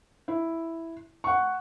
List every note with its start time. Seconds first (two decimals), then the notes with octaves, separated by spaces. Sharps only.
0.28 E4
1.24 F#5 C#6